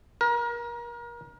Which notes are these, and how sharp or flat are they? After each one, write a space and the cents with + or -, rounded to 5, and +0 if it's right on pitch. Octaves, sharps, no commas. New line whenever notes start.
A#4 +30